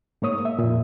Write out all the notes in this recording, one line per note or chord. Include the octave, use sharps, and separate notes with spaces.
G#2 A#3 C#5 D#6
E5
F2 A#2